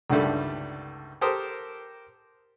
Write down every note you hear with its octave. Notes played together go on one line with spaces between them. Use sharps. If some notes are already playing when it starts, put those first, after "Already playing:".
C#2 G2 D3 D#3 G3 A3
G4 A4 A#4 C5 D#6